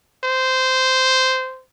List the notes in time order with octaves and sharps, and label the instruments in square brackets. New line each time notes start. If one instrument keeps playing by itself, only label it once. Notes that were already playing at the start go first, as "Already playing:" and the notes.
[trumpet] C5